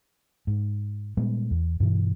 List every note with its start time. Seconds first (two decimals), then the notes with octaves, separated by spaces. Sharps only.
0.47 G#2
1.17 A#2 G3 G#3 B3
1.51 E2
1.80 G2 B2 E3